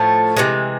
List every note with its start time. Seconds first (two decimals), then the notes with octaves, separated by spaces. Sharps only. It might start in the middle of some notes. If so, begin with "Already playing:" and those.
Already playing: A2 F3 A3
0.37 C3 E3 G#3